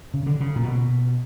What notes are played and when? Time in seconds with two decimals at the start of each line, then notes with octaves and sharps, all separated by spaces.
0.14 C#3
0.26 D3
0.40 C#3
0.56 A#2
0.63 B2